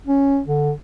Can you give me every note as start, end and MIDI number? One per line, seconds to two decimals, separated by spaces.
0.07 0.41 61
0.46 0.72 50